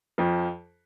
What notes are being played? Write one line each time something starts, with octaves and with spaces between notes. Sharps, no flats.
F2 F3